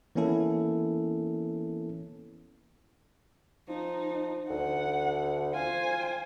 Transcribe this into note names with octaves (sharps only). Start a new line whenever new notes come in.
E3 A#3 B3 C#4 E4 A4
F3 D#4
D2 F#5
F4 C5 G#5